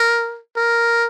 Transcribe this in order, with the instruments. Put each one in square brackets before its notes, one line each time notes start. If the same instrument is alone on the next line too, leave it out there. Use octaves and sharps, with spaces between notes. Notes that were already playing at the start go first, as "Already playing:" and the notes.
Already playing: [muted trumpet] A#4
A#4